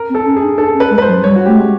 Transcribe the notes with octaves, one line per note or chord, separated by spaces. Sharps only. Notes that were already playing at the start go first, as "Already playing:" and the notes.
Already playing: A#4
C4
A4
C#4
G#4
D4
D4 A4
C#4
B4
G#3
B4
C5
F#3
G3 C#5
F#4
A3 G4
G#3